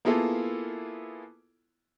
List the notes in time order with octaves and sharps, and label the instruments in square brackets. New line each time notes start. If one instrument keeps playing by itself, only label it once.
[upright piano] A#3 B3 E4 F4 G#4 A4